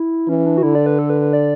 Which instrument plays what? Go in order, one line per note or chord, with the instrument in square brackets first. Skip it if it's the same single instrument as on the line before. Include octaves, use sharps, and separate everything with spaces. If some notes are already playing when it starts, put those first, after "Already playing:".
Already playing: [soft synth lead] E4
[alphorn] E3 [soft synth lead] C#4
[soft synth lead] D4
F#4
[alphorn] D3 [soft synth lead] E4
[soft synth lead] D5
B4
A4
B4
B4
D5